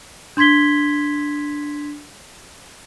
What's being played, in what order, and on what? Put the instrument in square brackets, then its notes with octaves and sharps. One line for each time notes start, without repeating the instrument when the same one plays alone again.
[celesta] D4 C6 G#6 B6 G7